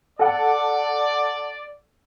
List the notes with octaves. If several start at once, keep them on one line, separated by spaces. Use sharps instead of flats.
A4 D5 F#5